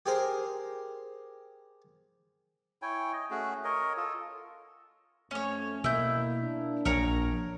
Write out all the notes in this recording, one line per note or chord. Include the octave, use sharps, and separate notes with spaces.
G4 G#4 A#4 C5
E4 C#5 G5 G#5
D#5
A3 C#4 F#4 G#4
A#4 C#5 D#5
F4 A4
F2 A3 C#4 C#5
B2 A#3 E4 G6
A#3 D4
A#1 A#4 C#5 A#5